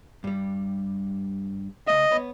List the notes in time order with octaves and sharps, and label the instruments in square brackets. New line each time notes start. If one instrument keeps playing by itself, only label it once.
[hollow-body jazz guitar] G2 G3
[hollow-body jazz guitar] C#3 A3 E5 [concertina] D#5
[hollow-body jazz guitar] B3 C#5 B5